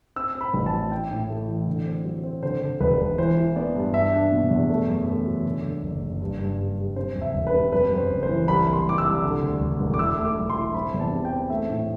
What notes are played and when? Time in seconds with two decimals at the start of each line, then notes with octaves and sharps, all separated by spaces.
0.16 C4 E6
0.35 C4
0.41 B5
0.54 A1
0.66 A5
0.73 F#3
0.91 E4 G5
1.11 A2
1.29 A3
1.48 E3
1.67 D3
1.86 C4
2.05 F#3
2.24 C4
2.43 D3 C5
2.62 D3
2.81 E1 B4
2.99 E1
3.18 E3 C5
3.37 E3
3.56 B3 D5
3.75 G2
3.94 D4 E5
4.13 D4
4.32 B2
4.51 E2
4.69 A3
4.88 F#2
5.07 A3
5.26 F#3
5.45 D3
5.64 D3
5.83 F#1
6.02 F#1
6.21 G2
6.39 G2
6.59 G3
6.78 G3
6.96 C3 C5
7.16 E1
7.22 E5
7.34 E1
7.47 B4
7.53 C3
7.72 F#2 B4
7.91 F#2
7.97 C5
8.10 F#1
8.23 C5
8.29 E3
8.48 C2 B5
8.66 C2
8.73 C6
8.85 C2 D6
8.98 E6
9.05 C2
9.23 D3
9.42 D2
9.61 E1
9.80 E1
9.94 D6
9.99 E4 E6
10.18 A3
10.24 D6
10.37 B1
10.50 C6
10.56 E4
10.74 C4 B5
10.94 E2
11.00 A5
11.12 C3
11.25 G5
11.31 C4
11.50 A3 E5
11.69 A2